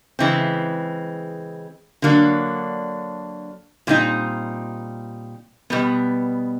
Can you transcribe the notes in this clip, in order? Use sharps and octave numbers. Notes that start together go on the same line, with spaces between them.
C#3 E3 G#3 C4
D3 F#3 A#3 D4
A#2 G3 C4 D#4
B2 G3 B3